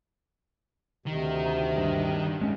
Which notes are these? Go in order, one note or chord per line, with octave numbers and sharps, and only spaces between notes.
D2 C3 D#3
G2
F2 A2 G#3 C#4